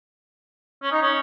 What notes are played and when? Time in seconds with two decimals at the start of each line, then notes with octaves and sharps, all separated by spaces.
0.82 C#4
0.91 D#4
1.01 C#4